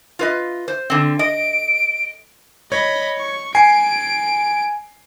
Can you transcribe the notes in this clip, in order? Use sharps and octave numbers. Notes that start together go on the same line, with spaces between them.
F4 B4 D#5
C5
D3 C4
D#5 D7
C#5 D#5 B5
C#6
G#5 C7 D7